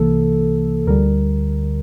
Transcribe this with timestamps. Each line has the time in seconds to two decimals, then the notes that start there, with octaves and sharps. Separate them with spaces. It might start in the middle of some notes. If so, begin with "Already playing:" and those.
Already playing: C2 C3 E3 A#3 A4
0.87 D2 D3 G3 A#4